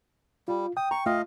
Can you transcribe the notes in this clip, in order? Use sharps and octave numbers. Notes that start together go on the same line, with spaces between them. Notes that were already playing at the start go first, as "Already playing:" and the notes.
G3 F4
G5 D#6
A#5 C#6
A3 F4 D#5 F5